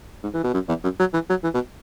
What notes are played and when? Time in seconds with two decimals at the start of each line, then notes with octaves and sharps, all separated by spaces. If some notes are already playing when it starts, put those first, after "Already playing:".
0.23 G#2
0.34 E3
0.44 B2
0.54 F#2
0.68 E2
0.83 F#2
0.99 F#3
1.13 E3
1.29 F#3
1.43 E3
1.54 B2